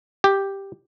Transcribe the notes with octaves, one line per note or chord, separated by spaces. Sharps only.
G4